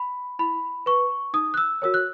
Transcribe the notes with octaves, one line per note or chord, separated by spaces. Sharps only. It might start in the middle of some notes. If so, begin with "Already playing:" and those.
Already playing: B5
E4 B5
B4 C#6
D#4 D#6
F#6
E6
F#4 A#4 C#5 E6
F#6